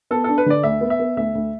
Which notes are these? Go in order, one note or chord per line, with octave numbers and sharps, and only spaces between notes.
B3 A4
D4 A4
B4
D3 D5
D2 E5
B3
E5
B3
D2 E5
D2